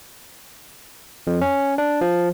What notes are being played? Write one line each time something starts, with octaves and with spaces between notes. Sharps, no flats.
F2
C#4
D4
F3